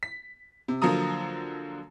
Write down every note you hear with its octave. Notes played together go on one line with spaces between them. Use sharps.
B6
C3
D3 F3 F#3 A#3 A#5 D#6